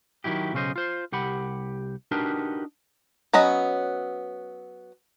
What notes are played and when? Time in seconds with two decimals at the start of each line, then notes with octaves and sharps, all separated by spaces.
0.24 D#3 E3 F#3 E4 G4
0.53 B1 C#3 C#4 F4 C5 D#5
0.76 F4 C5
1.12 C2 G4 F#5 B5
2.11 D4 D#4 F#4 G4 A#4 B4
3.33 F#3 B3 C#4 D#5